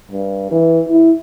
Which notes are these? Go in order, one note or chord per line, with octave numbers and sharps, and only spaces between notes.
G2
E3
E4